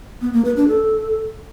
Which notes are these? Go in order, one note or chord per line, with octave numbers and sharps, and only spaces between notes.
B3
A#3
B4
D4
A4